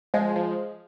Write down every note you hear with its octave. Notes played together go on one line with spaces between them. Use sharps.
F3 G#3
F3